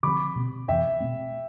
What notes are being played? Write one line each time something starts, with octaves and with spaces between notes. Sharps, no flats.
D3 F3 C4 B5 D6
B2 A3 C4
F2 C3 E3 B3 E5 G5
B2 A3 C4